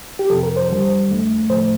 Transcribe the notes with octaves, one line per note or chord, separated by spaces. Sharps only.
G4
F2 C3 F3 A4
A#4
C5
E2 D3 G3
F2 D3 A3
A2 F3 A3 C5